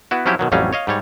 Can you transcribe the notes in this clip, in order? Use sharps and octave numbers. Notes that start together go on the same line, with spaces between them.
B3 E4 F#4
F3 F#3 C4 C#4 E4 G4
B2 D#3 F#3
A1 F2 F#3 G3 C#4 F5
C#5 D#5 F5
G#2 G3 C#5